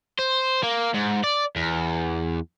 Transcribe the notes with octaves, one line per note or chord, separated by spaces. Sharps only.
C5
A#3
G#2
D5
E2